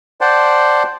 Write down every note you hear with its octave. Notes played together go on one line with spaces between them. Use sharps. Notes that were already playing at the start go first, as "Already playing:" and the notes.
C5 D5 F#5 G5 A5 C6